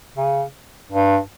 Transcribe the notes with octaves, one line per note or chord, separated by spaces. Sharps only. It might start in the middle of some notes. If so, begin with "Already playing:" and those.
C#3
G2